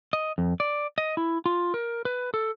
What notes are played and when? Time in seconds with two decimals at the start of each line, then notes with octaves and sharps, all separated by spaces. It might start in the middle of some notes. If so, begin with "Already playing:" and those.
0.13 D#5
0.38 F2
0.60 D5
0.98 D#5
1.17 E4
1.46 F4
1.74 A#4
2.05 B4
2.34 A4